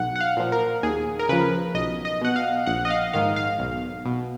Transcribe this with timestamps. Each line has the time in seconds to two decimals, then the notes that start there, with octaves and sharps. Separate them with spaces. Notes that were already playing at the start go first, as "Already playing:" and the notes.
Already playing: B1 F#5
0.16 F#5
0.20 F5
0.37 A#2 F3
0.52 A#4
0.83 D#2 G#4
1.19 A#4
1.29 C#3 F3 B4
1.75 B1 D#5
2.05 D#5
2.22 B2 F#5
2.36 F5
2.66 A#1 F#5
2.85 D#5
2.90 F5
3.13 G#2 D#3 F5
3.36 F5
3.59 B1
4.05 B2